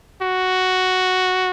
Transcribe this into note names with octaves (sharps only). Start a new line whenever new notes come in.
F#4